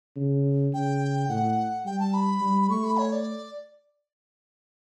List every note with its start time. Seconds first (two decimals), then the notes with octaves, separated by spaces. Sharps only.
0.16 C#3
0.73 C#3 G5
1.29 A2 F#5
1.85 G3 G5
1.99 A5
2.14 B5
2.41 G3
2.62 B5
2.69 A3 C#6
2.84 B5
2.98 C#5
3.12 D5